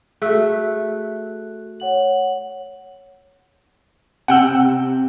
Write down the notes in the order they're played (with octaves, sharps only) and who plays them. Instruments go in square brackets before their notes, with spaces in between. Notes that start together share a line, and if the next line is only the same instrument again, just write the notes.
[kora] A3 [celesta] F#4 A4 F#6 [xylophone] G#4 E5 E6
[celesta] C#5 F#5 F#7
[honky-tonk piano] C3 [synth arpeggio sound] F#5 G5 E6